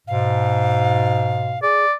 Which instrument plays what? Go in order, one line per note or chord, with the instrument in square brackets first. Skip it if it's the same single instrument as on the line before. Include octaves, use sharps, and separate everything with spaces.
[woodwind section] G#2 B2 [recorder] F5
[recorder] G#4 [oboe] D5